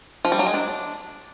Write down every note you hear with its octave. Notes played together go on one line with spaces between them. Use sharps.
F3
G3
F#3
G#3
D4